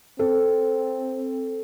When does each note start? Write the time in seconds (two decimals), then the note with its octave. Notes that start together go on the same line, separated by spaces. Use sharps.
0.19 C4 A4